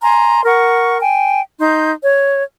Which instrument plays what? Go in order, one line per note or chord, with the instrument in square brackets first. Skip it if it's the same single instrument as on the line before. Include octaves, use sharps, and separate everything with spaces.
[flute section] G#5 A#5 C6
A#4 F#5 C#6
G5 G#5
D#4 C6 G6
C#5